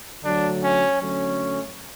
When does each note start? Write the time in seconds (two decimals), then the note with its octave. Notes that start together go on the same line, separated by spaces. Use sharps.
0.23 D3 F#3 A3 D4
0.62 C#4
1.00 D3 F#3 A3 C#4